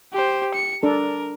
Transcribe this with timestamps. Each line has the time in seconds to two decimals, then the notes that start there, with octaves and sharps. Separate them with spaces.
0.13 G4 C5
0.54 C#7
0.83 D4 A4 A#4